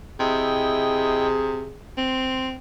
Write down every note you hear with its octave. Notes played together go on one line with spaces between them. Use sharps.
C3 E4 G#4 D#5 G5
C4 C6